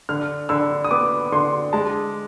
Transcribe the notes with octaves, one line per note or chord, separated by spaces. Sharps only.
D3 F6
D3 E6
D#6
B3 D6
D3 C6
G#3 A5